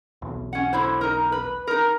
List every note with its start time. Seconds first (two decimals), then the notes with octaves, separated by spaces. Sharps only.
0.22 B1 E2
0.53 C#4 F#5
0.73 D3 E4 C5
1.01 D#4 A#4
1.32 B4
1.67 D#4 A#4